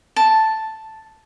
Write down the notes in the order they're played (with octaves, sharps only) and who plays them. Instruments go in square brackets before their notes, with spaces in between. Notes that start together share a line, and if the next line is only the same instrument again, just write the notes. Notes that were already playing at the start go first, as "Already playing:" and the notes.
[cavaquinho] A5